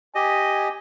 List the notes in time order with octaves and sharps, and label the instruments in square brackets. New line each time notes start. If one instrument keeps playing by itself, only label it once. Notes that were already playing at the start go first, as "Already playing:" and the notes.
[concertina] G4 D#5 [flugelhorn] G#5